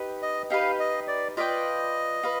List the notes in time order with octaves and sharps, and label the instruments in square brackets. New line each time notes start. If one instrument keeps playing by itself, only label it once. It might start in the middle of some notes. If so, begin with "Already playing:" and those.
Already playing: [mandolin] D#4 G4 B4
[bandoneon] D#5
[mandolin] D#4 G4 B4 [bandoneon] F5
[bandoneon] D#5
D5
[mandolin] F4 B4 D5 G5 [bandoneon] D#5
[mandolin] F4 B4